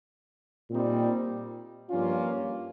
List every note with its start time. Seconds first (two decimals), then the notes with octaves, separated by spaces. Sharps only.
0.70 A#2 G3 C4 D#4
1.89 G2 F3 A#3 C#4 F4